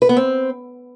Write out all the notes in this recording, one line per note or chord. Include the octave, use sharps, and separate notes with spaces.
B4
B3
C4